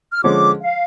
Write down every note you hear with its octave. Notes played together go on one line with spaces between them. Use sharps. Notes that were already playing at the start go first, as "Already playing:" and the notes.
F6
D3 F3 G#3 C#4 D6
F5